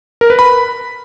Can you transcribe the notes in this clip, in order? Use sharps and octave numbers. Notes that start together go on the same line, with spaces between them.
A#4
B4
B5